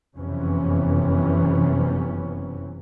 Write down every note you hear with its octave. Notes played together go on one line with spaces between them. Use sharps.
F#1 F2 C3 E3 B3 C#4